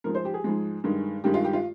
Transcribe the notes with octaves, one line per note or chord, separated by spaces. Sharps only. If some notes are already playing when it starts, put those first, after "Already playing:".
G#2 F3 G#3 A#4
C5
G4
G#4
G#2 F3 G#3
G2 D#3 G#3
G2 D#3 G#3 G4
F4
G4
F4